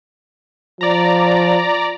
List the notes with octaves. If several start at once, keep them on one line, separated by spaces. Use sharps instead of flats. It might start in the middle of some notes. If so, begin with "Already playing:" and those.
F3 D5 A#5